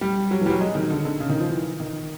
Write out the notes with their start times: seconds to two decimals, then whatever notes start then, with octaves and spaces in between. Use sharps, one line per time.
0.01 G3
0.31 F#3
0.41 E3 G3
0.50 F#3
0.61 G#3
0.75 D#3
0.90 D3
1.05 D3
1.20 C#3
1.29 D#3
1.40 F3
1.49 E3
1.80 D#3